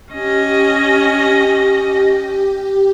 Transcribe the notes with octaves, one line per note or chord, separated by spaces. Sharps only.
C#4 G4 D#5